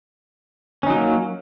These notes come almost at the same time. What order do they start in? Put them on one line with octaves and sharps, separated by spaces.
C#4 D#4 F#3 A#3